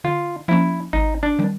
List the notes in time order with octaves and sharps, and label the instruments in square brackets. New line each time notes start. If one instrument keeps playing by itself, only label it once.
[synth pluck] D3 [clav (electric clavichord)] F4
[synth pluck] F3 A#3 C#4 [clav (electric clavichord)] E4
[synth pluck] G#1 [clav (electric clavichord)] D#4
[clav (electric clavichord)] D4
[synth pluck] D#3 G3